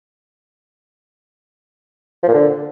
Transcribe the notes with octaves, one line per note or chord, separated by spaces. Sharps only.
F3
A#2
D3